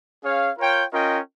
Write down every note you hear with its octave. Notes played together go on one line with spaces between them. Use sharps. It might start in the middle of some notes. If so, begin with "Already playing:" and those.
C#4 G#4 C#5 F5
F4 A#4 C#5 G5
C#4 F4 A#4 D#5 G5